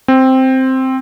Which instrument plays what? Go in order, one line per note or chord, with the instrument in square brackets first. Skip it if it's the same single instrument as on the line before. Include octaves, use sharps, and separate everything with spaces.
[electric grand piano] C4